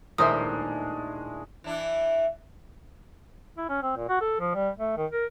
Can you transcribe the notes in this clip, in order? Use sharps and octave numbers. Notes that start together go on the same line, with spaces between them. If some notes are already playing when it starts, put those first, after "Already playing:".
D#1 A2 G#3 D4 A#4 C5 E5 D#6
E3 D4 E4
E4
C#4
C4
A#2
F#4
A4
F3
G3
A3
D#3
A#4